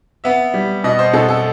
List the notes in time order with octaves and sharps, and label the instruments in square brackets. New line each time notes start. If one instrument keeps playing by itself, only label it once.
[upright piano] B3 E5
G3
B2 D#5
C5
B2 A4
A4